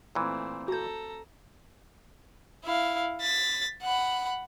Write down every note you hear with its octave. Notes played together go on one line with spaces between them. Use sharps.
A#2 E3 A3 C4
F#4 A4 A#5 G6
E4 F5
A6 B6
F#5 B5